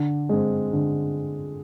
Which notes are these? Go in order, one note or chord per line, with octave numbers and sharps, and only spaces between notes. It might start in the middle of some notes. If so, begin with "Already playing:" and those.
Already playing: D3
G#3 C4
D3